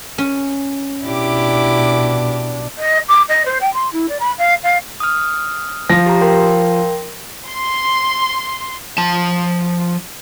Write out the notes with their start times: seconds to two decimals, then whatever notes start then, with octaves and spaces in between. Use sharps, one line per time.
0.18 C#4
1.06 B2 D4 E4 G4 D6
2.78 D#5
3.09 D6
3.28 D#5
3.46 C5
3.61 G5
3.73 C6
3.93 E4
4.09 D5
4.20 B5
4.38 F5
4.63 F5
5.00 D#6 F6
5.90 F3 A#6
6.06 G4 A#5
6.21 A#4 G5 C6
7.47 C6
8.98 F3 A5